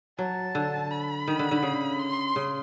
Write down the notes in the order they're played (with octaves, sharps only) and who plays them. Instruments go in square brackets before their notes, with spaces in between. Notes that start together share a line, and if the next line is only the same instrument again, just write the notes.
[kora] F#3 [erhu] A5
[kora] D3
[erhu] B5
[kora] D#3
D3
D3
C#3
[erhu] C6
[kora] C#3